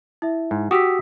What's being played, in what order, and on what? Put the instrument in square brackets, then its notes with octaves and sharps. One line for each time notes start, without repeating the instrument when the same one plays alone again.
[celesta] E4 E5
[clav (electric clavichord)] G#2
[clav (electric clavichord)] F#4 G4 [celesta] D#6 E6 B6